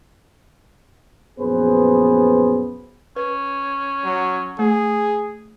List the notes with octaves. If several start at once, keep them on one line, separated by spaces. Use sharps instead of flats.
A#1 F#2 B3 G#4 B4 C5
C#4 B4
F#3
A3 G#4